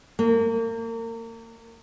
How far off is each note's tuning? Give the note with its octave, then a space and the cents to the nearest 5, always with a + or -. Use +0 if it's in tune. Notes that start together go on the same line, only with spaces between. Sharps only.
A#3 -35